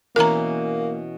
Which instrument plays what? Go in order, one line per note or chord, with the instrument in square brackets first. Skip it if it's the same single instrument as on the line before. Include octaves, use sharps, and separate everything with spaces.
[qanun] B2 E3 C#4 [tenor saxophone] A#3 [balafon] A#4 A#5